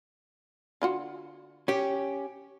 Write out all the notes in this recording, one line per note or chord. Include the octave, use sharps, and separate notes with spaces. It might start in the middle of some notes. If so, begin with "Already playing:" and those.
D3 F4 F#4
C#4 G4